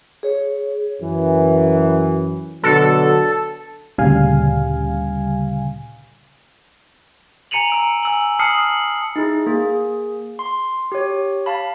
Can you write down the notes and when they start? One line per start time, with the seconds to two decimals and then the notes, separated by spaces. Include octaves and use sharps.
0.23 G#4 C#5
1.01 F#2 E3
2.64 B2 D3 F#3 A4
3.98 D2 A#2 C#3 G3 F5 G#5
7.51 G#5 A#5 C#7 D#7 F7 F#7
7.70 A#5 E6 D7
8.03 G#5 E6 F#7
8.39 A5 D#6 F6 C7 C#7 F#7
8.63 F#7
9.16 D#4 E4 G#4
9.46 A#3 G#4
10.39 C6
10.92 G4 C#5
11.46 F5 A5 B5